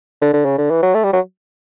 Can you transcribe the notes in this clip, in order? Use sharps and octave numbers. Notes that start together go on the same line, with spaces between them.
D3
D3
C#3
D3
E3
F#3
A3
G3
F#3